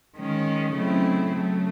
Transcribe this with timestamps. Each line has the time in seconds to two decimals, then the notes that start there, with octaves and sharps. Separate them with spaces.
0.16 D#3 G#3 C#4
0.73 C#3 F#3 A3 C4 E4
1.29 C#3 F#3 A3